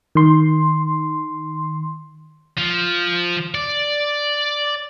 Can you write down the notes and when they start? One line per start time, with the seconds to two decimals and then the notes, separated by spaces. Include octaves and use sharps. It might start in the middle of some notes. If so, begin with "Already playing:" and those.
0.15 D#3 C6
2.58 F3
3.55 D5